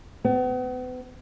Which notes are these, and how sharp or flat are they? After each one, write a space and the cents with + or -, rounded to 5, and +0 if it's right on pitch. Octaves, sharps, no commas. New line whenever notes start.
B3 +40